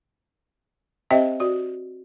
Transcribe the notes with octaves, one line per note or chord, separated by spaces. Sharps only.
C4 G4 C5 D#5 E5 G5
F#4 D5